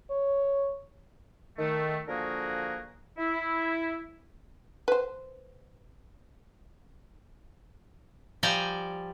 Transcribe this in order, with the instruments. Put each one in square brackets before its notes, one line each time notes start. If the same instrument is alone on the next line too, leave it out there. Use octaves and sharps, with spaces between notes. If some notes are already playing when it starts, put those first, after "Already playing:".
[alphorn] C#5
[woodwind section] D#3 A3
D3 F3 A#3 F#4 G#4 A#4
E4
[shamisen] B4 C5
[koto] F3 G3 D5 G5 G#5 A#5